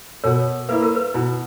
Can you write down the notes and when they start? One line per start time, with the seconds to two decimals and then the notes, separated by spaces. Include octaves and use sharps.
0.24 B2 A#4 C#5
0.69 A#3 E4 B4
0.82 A#4
0.95 B4
1.14 B2 E4